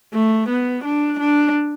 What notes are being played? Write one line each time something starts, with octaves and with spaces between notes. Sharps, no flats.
A3
B3
D4
D4